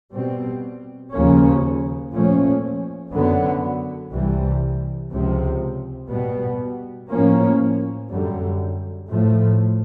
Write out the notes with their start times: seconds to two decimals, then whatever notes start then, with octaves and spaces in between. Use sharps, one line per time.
0.12 B2 G3 C4
1.12 D#2 C#3 F3 A#3 C#4
2.12 A#2 F3 A3 C#4
3.11 F#2 D3 F#3 B3
4.11 C2 C3 E3 G3
5.11 C#2 C3 F3
6.10 B2 G3 B3
7.10 A2 F3 A#3 C#4
8.10 F#2 D3 G3
9.09 A2 F3 A3